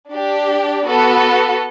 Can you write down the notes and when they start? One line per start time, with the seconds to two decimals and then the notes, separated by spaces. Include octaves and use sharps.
0.13 D4 G4
0.87 B3 F#4 A4